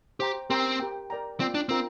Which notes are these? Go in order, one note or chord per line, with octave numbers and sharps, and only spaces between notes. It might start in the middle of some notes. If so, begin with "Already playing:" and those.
G4 C5 G5 A#5
C4 G4 A#4 G5 C6
G4 A#4 G5
A#4 D5 G5 A#5
C4 F4 D5 G5
D4
C4 D4 F4 A#4 G5